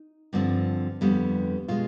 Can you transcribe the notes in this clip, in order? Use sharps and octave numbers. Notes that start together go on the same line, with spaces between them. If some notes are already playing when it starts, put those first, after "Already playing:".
Already playing: D#4
G2 D3 F3 C4
F2 D3 G3 B3
B2 G#3 F4